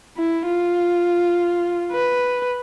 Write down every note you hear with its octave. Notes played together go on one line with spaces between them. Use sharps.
E4
F4
B4